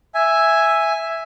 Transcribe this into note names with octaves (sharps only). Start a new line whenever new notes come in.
E5 G#5